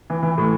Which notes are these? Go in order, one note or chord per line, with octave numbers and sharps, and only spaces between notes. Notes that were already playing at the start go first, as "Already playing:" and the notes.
E3
E3
A2